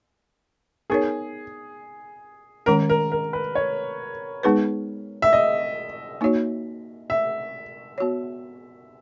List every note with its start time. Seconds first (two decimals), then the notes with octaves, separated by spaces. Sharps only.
0.90 B3 D#4 G#4 A#4 C#5
2.66 D#3 G#3 C#4 A#4
2.89 A#4
3.12 A#4
3.33 B4
3.55 C#5
4.43 G#3 B3 D#4 G#4 B4
5.22 E5
5.33 D#5
6.21 A#3 D#4 F#4 C#5
7.10 E5
7.98 B3 F#4 C#5